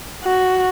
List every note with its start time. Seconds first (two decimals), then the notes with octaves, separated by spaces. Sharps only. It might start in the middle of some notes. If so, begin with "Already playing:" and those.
0.24 F#4